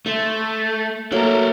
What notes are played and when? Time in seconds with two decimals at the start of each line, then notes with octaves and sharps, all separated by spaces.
0.06 A3 E5 C6
1.12 F#3 A3 A#3 A4 A#4